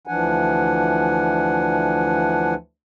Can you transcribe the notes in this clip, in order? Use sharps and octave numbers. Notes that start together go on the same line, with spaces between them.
D2 E3 F3 D4 F#5 G#5